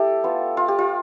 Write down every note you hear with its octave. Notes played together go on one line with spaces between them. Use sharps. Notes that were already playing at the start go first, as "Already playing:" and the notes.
Already playing: A3 E4 G4 A4
B3 F4
F4
G4
F4